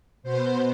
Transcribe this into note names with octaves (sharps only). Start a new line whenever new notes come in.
B2 B3 C5